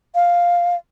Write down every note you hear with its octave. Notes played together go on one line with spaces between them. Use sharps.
F5